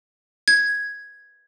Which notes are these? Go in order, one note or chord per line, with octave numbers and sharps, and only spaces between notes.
G#6